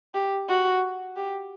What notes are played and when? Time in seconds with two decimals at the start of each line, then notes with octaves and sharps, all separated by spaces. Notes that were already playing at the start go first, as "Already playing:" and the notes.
0.14 G4
0.49 F#4
1.16 G4